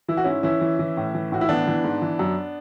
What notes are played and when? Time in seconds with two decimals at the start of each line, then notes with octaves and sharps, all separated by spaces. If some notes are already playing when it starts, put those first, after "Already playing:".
0.08 E3 E4
0.17 F#4
0.24 G#2 C#4 E4
0.43 E3 C#4 E4
0.61 E3
0.79 E3
0.97 A2
1.15 E3
1.32 A2 F#4
1.41 E4
1.49 E3 B3 D4
1.68 E3
1.84 G#2
2.02 E3
2.19 F#2